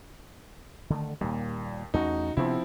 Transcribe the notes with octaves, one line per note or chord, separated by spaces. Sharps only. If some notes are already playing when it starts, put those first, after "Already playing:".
D3 D#3 A3
D#2 A#2 G3
E2 A3 C#4 D#4 F#4
C3 F3 B3 C4 D4 E4